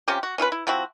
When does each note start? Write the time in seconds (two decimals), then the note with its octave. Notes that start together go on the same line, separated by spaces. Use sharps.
0.08 C3 C#4 F4 G4
0.23 F#4
0.38 C#4 F4 G#4 B4
0.52 E4
0.67 F3 C4 E4 F#4